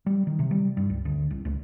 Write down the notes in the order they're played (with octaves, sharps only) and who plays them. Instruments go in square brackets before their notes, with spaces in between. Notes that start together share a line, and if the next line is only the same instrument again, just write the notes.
[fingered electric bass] G3
D#3
C3
G3
G2
C#2
D2
C2
C#2